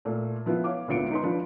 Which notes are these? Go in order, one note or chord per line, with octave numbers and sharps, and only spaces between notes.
A#2 A3 F4
F3 B3 E4 F4
C#5 F5 D6
G#1 D2 B3 F4 C#7 D7
D#4 B4 C6
F3 D4 F4 B4